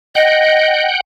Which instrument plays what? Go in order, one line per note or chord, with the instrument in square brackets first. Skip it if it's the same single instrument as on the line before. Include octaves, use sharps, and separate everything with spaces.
[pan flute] D#5 [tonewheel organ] F#5 G5